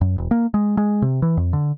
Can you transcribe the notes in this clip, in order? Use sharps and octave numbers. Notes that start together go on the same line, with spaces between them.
F#2
E1
A#3
G#3
G#3
C3
E3
F2
D3